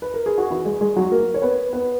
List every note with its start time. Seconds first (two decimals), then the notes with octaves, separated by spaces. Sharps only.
0.02 B4
0.14 A#4
0.26 G#4
0.38 F#4
0.50 E3 E4
0.65 G#3 G#4
0.81 G#3 G#4
0.96 F#3 F#4
1.12 A#3 A#4
1.34 C#5
1.42 B3 B4
1.73 B3 B4